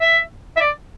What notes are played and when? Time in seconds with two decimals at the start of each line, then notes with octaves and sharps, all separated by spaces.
0.01 E5
0.57 E5
0.61 D5